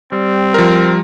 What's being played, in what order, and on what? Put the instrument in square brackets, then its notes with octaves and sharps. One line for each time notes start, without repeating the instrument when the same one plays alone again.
[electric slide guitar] G3 [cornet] C4
[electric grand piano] F3 A#4